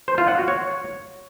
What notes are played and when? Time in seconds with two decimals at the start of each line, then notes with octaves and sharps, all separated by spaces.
0.08 C5
0.18 F4
0.28 F#5
0.38 F#4
0.48 C#5